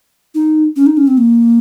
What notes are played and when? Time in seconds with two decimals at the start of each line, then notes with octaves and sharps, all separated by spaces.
0.35 D#4
0.76 C#4
0.86 D#4
0.97 C#4
1.07 C4
1.18 A#3